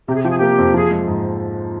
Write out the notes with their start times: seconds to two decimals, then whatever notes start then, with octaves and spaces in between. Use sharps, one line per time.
0.08 C3 G4
0.16 G#4
0.23 F3 G4
0.30 G#4
0.37 A#3 G4
0.58 F2
0.74 F3 G#4
0.91 G#3
1.07 G#2